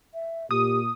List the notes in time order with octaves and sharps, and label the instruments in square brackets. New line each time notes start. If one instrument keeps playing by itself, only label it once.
[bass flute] E5
[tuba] A#2 [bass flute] G4 [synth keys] D#6